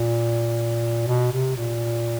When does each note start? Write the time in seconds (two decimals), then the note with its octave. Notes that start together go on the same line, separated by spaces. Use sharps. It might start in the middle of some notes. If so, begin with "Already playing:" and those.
Already playing: A#2
1.07 B2
1.32 C3
1.56 A#2